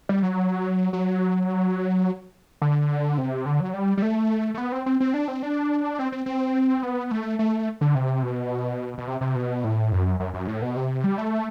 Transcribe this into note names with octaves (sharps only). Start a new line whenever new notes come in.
G3
F#3
F#3
D3
C3
D3
F#3
G3
G3
A3
A3
B3
C4
C4
C4
D4
C4
D4
C4
C4
C4
B3
A3
A3
D3
C3
B2
B2
C3
C3
B2
A2
F#2
F#2
F#2
A2
B2
C3
G3
A3